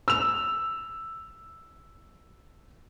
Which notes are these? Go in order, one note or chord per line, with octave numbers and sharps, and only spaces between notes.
E6 F7